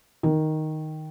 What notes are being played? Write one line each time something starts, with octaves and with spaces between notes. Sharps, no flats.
D#3